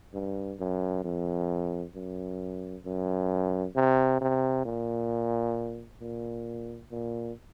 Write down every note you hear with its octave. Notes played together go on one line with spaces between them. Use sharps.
G2
F#2
F2
F#2
F#2
C3
C3
A#2
A#2
A#2